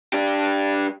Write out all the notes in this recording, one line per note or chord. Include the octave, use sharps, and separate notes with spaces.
D4 G4